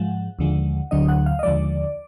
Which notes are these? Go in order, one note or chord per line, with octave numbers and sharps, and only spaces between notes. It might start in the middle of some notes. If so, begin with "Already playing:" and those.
Already playing: G#2 F3 G#3 F#5
D#2 D3 F3 G#3
D2 D3 F#3 D4 D#5
F#5
F5
D#5
D#2 D3 F3 G#3 D5